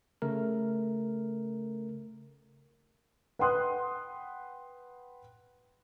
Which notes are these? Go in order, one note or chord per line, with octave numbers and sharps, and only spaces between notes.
C#3 A3 A#4
B4 F#5 G5 C6 D#6 F#6